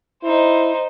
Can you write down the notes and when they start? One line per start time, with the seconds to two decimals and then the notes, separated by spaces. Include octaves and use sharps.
0.23 D#4 E4 C5